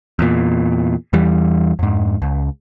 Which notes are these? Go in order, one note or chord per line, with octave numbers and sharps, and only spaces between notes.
E2 A#2
E2 E3 G3
F2 G#2
C#2